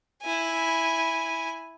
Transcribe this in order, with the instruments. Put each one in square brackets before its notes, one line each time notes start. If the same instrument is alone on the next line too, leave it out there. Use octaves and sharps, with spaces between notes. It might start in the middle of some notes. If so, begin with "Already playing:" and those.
[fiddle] E4 G#5